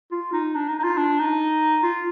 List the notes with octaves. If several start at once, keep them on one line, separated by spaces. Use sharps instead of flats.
F4
D#4
D4
D#4
D#4
F4
D4
D#4
F4